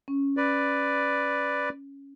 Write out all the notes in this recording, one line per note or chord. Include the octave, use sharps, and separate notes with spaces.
C#4
B4 D5